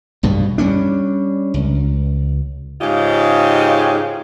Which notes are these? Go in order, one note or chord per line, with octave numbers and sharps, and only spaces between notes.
B1 G2 B2
G3 A#3 C#4 D4
C#2
G#2 C#3 D#4 F4 G4